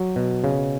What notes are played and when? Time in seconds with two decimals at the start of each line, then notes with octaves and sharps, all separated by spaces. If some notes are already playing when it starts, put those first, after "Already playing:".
Already playing: F#3
0.16 B2
0.44 C#3